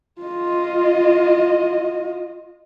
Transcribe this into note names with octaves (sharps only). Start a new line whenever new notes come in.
F4 D#5